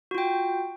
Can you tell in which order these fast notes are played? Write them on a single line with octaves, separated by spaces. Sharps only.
F#4 F4 G5